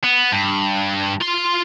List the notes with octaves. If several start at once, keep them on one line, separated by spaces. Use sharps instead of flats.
B3
G2
F4 C6